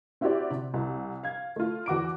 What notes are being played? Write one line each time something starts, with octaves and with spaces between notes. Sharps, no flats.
C4 E4 F#4 G4 C5 D5
C3
C2
F5 G#6
A3 F4
E2 F#4 D6 D7